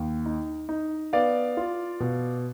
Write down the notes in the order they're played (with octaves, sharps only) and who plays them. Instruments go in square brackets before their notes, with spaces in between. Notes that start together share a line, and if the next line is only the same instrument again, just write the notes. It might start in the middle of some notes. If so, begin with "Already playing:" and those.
Already playing: [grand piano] D#2
D#4
D#4
B3 D5 F5
F4
B2